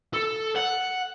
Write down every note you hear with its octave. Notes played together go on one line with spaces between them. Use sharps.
A4
F#5